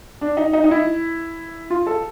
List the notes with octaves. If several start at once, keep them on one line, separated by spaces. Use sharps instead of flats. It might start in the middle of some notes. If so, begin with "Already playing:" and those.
D4
D#4
D#4
D#4
E4
F4
A4